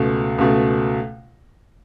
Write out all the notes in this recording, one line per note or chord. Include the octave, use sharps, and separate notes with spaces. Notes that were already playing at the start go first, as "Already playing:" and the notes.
Already playing: C#2 B2 A3
C#2 B2 A3